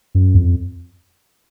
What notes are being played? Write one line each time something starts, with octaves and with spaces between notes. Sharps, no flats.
F#2
F2